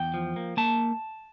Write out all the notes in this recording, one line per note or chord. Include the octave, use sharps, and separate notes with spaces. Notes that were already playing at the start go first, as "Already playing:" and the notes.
Already playing: E2 G5
F3
A#3
A#3 A5